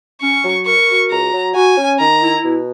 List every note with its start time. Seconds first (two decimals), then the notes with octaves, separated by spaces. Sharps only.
0.21 C#4 C#6
0.44 F#3
0.66 A#4 C#6
0.88 F#4
1.11 C#2 A#5
1.33 F#3
1.55 F#4 G#5
1.77 C#4
1.99 D#3 A#5
2.21 E4
2.45 B2